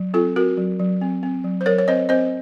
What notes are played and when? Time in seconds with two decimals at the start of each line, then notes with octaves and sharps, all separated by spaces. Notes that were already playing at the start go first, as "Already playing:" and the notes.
Already playing: F#3
0.14 C4 F4 A4
0.36 C4 F#4 A#4
0.57 F#3
0.79 F#3
1.01 C4
1.23 C4
1.44 F#3
1.61 C5
1.66 F#3 A#4 C#5
1.78 C#5
1.88 C4 C5 D#5
2.09 C4 C5 D#5